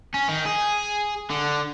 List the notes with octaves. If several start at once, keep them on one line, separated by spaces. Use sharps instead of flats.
C#4
D#3
G#4
D3